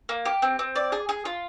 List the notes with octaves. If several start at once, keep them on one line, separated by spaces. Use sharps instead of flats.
A#3
G4
C4
C4
D5
G#4
G#4
F4